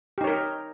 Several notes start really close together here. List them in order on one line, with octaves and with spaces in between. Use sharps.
G4 D#4 C#5 A#4